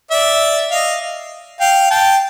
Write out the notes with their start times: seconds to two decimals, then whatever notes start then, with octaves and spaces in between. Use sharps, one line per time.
0.11 D5 E5
0.71 D#5 F5
1.60 F5 G5
1.90 G5 A5